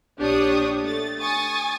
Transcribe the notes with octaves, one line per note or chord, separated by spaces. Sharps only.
A#1 D4 G4 C#5 C#6 D#6
A3 A6
G#5 C#6 D#6 A6